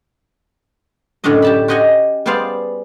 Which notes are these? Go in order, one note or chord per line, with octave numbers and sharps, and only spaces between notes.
F#2 A2 D3 C#4 D4 D#5
G4 A5 B5
F#4 G4 D#5 F#5 G#5
G3 B3 G#4 C5 D5 F5